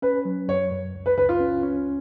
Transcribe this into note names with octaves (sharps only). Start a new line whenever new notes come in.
C#4 B4
F#3
F#2 C#5
F#2
C#2
B4
C#2 B4
F4
C#4
C#4